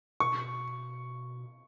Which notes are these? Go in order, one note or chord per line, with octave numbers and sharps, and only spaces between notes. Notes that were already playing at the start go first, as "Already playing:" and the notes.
B2 C#6